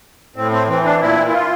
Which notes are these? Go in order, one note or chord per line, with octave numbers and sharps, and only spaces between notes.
A2 C4
C4
E3 C4
D4
A#2 E4
E4
F4